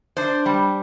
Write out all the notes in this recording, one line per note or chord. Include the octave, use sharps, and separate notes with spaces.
D4 C5
G3